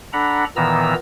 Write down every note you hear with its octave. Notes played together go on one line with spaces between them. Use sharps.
D4 A4 F#5 A#5 B5
A#2 D#3 E3 B3 A#5 E6